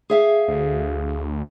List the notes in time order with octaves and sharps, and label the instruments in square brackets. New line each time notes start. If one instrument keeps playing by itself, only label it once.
[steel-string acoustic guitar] G#4 E5 F5
[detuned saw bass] D2